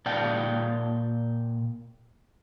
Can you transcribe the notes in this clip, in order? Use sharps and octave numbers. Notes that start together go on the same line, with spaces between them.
A#2 D5 F5 G5 A5